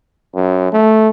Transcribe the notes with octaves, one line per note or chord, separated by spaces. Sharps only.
F#2
A3